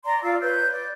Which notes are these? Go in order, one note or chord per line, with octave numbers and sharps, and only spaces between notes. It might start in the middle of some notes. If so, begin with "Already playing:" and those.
D5 A#5 C6
F4 D5 F5 E6
B4 C#5 G6
D5